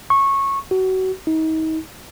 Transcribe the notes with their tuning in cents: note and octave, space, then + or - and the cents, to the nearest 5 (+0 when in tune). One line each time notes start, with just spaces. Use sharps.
C#6 -15
F#4 +25
D#4 +35